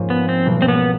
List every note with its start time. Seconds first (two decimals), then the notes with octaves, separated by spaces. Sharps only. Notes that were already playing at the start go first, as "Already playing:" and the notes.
Already playing: G#2 F3 A#3 C#4
0.10 B3
0.29 C4
0.46 B1 B2 G3 A#3
0.62 C4
0.68 B3